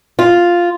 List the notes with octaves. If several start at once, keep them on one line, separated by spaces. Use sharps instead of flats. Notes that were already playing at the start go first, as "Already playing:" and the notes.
F4